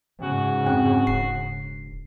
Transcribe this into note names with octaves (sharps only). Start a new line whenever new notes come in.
G#2 C#3 F#4
F2 C4 C#4 F#6
E1 C7